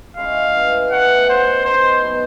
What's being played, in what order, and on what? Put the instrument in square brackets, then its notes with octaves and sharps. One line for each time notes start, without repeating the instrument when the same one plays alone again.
[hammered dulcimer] G#3 C#4 E4 [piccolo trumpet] F5
[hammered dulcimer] C#3 E3 A3
[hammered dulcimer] C#3 E3 A3 [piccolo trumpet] F#5
[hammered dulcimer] B3 D#4 G#4 [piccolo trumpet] C5
[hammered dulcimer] B3 D#4 G#4 [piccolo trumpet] C5
[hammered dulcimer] B2 F#3 B3